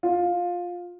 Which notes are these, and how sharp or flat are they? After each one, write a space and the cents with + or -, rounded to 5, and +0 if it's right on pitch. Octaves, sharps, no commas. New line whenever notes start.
F4 +15